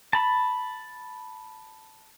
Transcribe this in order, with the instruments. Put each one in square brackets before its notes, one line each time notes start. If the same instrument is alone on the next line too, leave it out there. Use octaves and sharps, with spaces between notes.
[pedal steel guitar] A5 B5